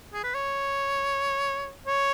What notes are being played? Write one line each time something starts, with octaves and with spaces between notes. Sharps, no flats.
G#4
B4
C#5
C#5